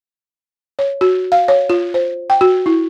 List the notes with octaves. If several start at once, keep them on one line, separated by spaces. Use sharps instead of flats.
C#5
F#4
F5
C#5
F4
C5
G5
F#4
E4